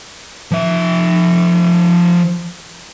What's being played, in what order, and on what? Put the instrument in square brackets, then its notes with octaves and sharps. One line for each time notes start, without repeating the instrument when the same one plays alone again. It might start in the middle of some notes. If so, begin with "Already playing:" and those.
[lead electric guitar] F3 E5